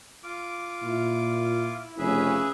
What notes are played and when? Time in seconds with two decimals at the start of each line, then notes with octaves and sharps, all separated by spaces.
0.23 F4 D6
0.83 A#2 E4
1.98 F1 C#3 C#4 G#4 B4 E5